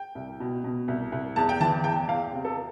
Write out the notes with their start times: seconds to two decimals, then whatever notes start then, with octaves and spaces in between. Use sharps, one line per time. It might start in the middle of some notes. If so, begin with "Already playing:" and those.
Already playing: G5
0.15 C2
0.40 B2
0.64 B2
0.88 C2
1.12 C2
1.36 E2 A5
1.49 G5
1.60 E3 A5
1.84 E2 G5
2.08 E2 F5
2.32 C3
2.45 A4